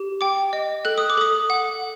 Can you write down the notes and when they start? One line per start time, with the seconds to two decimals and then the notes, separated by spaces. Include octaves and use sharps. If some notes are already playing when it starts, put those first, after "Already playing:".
Already playing: G4
0.21 G5 D6
0.53 D#5
0.85 A4 F#6
0.98 D#6
1.10 D6
1.18 A4 D#6
1.50 F#5